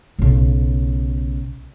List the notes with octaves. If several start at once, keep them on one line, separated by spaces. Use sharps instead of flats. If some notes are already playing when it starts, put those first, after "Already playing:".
B1 C#3